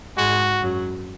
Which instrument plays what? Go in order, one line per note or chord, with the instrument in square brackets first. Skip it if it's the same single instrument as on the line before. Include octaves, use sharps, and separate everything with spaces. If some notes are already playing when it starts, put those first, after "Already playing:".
[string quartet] G#2 G#3 [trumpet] F#4
[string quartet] F#2 F#3